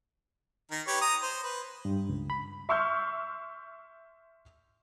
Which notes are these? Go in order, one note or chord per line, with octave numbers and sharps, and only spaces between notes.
D#3 A#4
G4 B4 C#5
A#5 D#6
C5
B4
G2
C#2
B5
E5 C6 C#6 E6 F6 G6